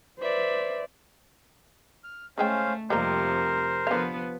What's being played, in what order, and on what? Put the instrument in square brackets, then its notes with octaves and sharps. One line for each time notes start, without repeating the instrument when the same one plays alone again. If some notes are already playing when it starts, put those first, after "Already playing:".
[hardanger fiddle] B4 E5 [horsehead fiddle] C5 D5
[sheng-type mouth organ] F6
[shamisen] C#3 G#3 G5 [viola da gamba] A3 [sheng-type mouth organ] C#4 C5 F5
[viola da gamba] F2 C3 [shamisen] G3 A#3 D#4 [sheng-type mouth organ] A#4 [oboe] C5
[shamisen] D3 F5 [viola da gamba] F3 B3 B4